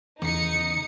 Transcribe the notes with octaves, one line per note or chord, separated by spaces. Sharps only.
E2 C#3 D#4 D#6 C#7